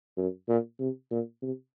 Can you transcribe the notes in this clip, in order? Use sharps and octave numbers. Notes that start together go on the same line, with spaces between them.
F#2
A#2
C3
A#2
C3